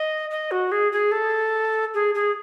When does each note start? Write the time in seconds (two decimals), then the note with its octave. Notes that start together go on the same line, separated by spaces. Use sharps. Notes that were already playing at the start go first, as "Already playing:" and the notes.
Already playing: D#5
0.31 D#5
0.51 F#4
0.72 G#4
0.92 G#4
1.12 A4
1.94 G#4
2.14 G#4